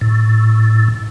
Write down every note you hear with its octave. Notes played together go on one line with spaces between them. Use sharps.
A2